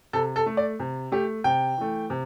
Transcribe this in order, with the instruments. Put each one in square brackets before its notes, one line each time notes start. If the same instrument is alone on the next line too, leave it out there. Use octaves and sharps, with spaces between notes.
[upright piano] C3 A4
A4
A3
D5
C3
A3 G4
C3 G5
E3 A3
C3